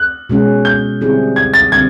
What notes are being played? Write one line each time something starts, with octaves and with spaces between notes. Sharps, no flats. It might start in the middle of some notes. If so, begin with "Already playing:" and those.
Already playing: F#6
B2 G#3 C#4
G6
D3 G3 C4 E4 G#4
G#6
A6
D3 G3 C4 G#6